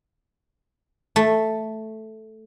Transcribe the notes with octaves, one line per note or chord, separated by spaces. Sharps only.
A3